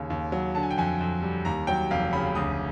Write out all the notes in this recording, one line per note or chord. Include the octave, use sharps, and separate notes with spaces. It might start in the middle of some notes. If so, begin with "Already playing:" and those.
Already playing: D#2 C#3
D#2
F#3
D3 A5
G#5
G5
F2 G#5
F2
G3
D#2 A#5
F#3 G5
F1 F5
C#3 B5
D2 D#6